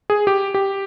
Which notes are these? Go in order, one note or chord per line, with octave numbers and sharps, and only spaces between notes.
G#4
G4
G4